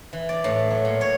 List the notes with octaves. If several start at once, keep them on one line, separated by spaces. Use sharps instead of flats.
E3
D5
A2
F#3
A#2
C#5